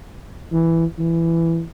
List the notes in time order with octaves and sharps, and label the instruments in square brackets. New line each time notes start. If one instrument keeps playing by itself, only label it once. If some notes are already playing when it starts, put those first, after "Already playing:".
[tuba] E3
E3